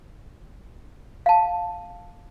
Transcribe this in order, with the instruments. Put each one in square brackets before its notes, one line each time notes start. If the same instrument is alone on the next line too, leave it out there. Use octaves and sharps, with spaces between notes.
[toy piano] F5 A5